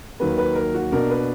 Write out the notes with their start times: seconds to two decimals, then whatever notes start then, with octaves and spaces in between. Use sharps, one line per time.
0.20 D#2 D#3 F#3 A#3 B4
0.38 B4
0.55 A#4
0.74 F#4
0.92 B2 A#3 D4 A#4
1.10 B4